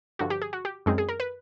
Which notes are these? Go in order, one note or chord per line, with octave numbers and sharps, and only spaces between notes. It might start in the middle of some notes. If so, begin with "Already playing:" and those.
G2 D3 F3 F#4
G4
G#4
F#4
G4
F#2 D#3 G#3 C4 G#4
G#4
A#4
B4